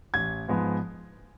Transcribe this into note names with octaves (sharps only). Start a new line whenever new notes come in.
A1 G#6
G#2 F3 G#3 B3